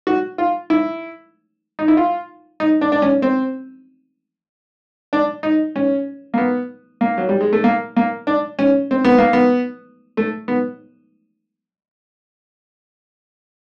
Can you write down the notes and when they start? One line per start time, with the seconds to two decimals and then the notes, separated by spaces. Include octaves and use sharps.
0.07 F#4
0.38 F4
0.70 E4
1.79 D#4
1.88 E4
1.97 F4
2.60 D#4
2.81 D4
2.92 D4
3.02 C#4
3.22 C4
5.13 D4
5.43 D#4
5.76 C#4
6.34 A#3
6.38 B3
7.01 A#3
7.18 F#3
7.29 G3
7.41 G#3
7.53 A3
7.64 A#3
7.96 A#3
8.27 D4
8.59 C#4
8.91 C4
9.05 B3
9.18 A#3
9.33 B3
10.17 A3
10.48 B3